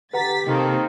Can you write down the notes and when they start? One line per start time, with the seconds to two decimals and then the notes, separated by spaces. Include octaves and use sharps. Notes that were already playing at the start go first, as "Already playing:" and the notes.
0.13 D3 G4 B4 F#5 A#5 A6 B6
0.47 C3 D#3 A#3 C4 A4